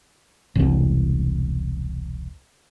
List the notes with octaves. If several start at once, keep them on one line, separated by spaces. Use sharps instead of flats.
E1 C2